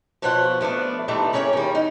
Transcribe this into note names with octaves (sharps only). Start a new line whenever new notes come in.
B2 F3 F4 C5 C#5 F#5
F3 A3 B3 D4
D3 E3 G3 A3 D4 D#4
A#3 C#4 G#4 C#5 F#5 G5
D#3 G3
D#4